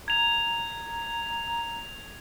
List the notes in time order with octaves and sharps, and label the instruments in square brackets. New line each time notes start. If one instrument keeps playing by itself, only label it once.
[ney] A#5 [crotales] G#6 F7